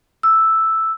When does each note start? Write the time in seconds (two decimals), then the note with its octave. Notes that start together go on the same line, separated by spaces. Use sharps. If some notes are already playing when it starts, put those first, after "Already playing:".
0.23 E6